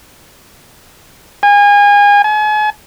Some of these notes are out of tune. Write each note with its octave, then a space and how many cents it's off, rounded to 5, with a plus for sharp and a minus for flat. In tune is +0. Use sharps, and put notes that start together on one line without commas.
G#5 -30
G#5 +40